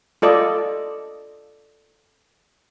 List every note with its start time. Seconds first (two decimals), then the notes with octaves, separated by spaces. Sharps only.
0.22 F4 A4 D5 D#5